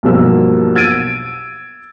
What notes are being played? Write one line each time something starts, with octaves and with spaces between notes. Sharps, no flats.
B1 G2 B2 F3 A#3 E6
E6 G#6 A6 D7 D#7